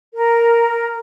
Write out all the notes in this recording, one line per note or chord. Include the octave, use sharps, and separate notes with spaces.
A#4